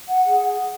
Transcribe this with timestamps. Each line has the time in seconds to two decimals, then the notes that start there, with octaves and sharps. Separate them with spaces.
0.08 F#5
0.24 G#4